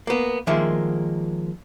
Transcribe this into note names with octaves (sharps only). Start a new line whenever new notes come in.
A#3 B3
D#3 F3 G#3 A#3 E5